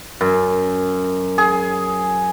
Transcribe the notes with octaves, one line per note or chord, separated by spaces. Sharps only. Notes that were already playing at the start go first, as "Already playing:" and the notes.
F#2
G#4